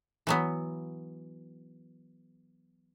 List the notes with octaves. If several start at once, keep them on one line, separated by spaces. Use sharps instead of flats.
E3 F#3 B3